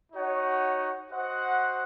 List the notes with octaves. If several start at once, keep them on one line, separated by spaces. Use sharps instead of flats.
D#4 F#4 C#5 F#5
F#4 C5 D#5 F#5